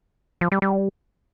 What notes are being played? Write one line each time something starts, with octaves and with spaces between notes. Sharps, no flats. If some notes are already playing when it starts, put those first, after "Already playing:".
F3
G3
G3